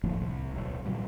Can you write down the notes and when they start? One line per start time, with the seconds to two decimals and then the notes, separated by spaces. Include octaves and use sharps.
0.04 D#1 A2 F3 A#3
0.21 C2
0.52 D1 B1
0.86 A#2 F#3 G3